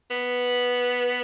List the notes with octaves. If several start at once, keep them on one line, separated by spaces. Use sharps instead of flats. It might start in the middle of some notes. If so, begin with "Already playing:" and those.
B3